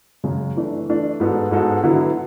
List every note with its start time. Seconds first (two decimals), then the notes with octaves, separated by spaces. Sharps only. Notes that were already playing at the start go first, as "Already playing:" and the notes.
0.24 F#2 C#3 G#3
0.56 E3 A3 D4
0.88 E3 A3 D4
1.20 G#2 G#3 B3 F#4 A4
1.51 G#2 G#3 B3 F#4 A4
1.83 D3 F#3 B3 E4